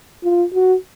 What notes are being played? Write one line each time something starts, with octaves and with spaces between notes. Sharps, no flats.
F4
F#4